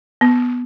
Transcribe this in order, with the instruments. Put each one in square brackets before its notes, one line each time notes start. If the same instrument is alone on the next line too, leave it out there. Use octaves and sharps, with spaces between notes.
[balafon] B3